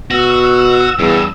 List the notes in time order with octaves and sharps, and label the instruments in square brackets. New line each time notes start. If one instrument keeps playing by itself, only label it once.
[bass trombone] B2 [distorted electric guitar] F#4 [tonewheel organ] E6
[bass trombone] E2 [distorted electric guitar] G2